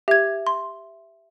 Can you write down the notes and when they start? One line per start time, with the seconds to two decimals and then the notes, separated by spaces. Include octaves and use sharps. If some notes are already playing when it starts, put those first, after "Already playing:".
0.08 G4 E5 G#6
0.47 C6